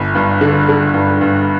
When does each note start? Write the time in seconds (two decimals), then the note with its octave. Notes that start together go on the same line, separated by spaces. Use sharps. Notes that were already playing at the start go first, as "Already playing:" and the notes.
Already playing: G1
0.15 G2
0.41 D3
0.69 D3
0.94 G2
1.21 G2